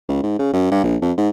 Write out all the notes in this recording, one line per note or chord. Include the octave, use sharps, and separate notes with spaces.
C#2
G#2
C#3
F#2
G2
A#1
F2
G#2